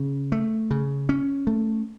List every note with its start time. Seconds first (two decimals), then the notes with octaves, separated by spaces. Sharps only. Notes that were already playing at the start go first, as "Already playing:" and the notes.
Already playing: C#3
0.32 A3
0.71 C#3
1.09 C#4
1.47 A3